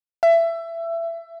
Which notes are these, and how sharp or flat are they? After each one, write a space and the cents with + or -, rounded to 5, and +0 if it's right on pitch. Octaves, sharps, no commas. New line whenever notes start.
E5 +20